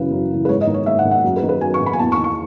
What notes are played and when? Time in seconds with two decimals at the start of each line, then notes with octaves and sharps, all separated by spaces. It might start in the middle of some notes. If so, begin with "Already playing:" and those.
Already playing: F#2 C#3 E3 B4
0.11 F#2
0.31 C#3 E3
0.45 B4
0.49 G#2 C#5
0.61 D#5
0.67 D#3
0.74 C#5
0.86 G#2 E5
0.99 F#5
1.05 D#3
1.11 F#5
1.24 F#2
1.36 B4
1.43 D#3
1.49 B4
1.61 F#2 G#5
1.74 C#6
1.81 D#3
1.86 B5
1.93 G#5
1.99 E2 A5
2.12 C#6
2.18 D#3
2.24 C#6